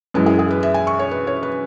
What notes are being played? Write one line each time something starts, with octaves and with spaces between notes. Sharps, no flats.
F#2 E3 G#3 B4
G#4
G#4
B4
E5
G#5
C#6
C#5
B4
C#5
B4